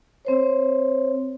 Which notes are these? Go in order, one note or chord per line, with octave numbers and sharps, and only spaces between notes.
C4 C5 C#5